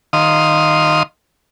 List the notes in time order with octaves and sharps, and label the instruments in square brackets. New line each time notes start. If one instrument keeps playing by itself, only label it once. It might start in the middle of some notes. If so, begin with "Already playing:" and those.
[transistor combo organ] D#3 F5 C6 D#6